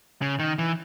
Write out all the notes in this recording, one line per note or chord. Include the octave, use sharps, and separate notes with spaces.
C#3
D#3
E3